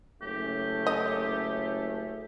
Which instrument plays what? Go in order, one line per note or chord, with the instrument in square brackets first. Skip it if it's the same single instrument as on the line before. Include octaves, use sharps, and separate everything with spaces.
[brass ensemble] F#1 A3 C#4 [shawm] G4
[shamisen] D#5